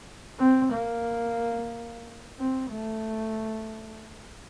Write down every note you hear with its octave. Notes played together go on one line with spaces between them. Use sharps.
C4
A#3
C4
A3